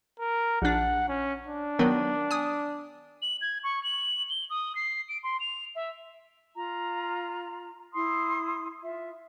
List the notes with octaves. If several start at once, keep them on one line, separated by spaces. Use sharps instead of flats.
A#4
A#1 D4 F#5
C#4
D4
D#3 F#3 B3
G#5 D#6
F#7
G#6
C#6
F#7
G7
D#6
C7
D7
C6
F7
E5
F4 A#5
E4 C6 D#6
F4 E5